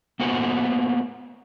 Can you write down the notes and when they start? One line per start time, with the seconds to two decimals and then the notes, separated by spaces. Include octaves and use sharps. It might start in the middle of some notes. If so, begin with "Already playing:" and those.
0.20 A#3 B3 F#4 C5 F#5 G#5